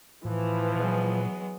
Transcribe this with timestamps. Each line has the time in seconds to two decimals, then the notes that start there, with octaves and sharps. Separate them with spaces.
0.25 A2 E3 F3
0.76 A#2 F#3 G#3 B3